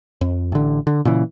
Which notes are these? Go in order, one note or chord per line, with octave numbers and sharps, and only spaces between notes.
F2
A1 D3
D3
A#2 C#3 E3